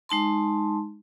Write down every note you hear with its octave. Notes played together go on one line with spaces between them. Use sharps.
G#3 D#4 A5 C6